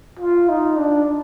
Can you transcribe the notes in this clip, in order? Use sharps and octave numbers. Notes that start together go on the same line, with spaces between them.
F4
D#4
D4